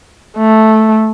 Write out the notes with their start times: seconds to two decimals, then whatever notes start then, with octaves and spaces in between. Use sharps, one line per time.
0.37 A3